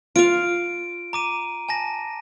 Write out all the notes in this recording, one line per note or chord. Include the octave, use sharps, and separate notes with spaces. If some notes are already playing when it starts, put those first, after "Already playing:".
F4 F5 D7
A#5 D6 D#7
G#5 A5 A#6